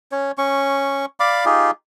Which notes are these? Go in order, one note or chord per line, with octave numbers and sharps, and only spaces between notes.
C#4 C#5
C#4 C#6
D5 F5 B5 D6
D#4 F4 G4 G#4